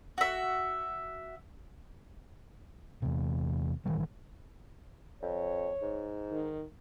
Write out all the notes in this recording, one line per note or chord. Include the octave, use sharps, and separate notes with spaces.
F#4 E5
E2 C3
G#1 D#3 E3 G3
F2 C#5
G#2
D#3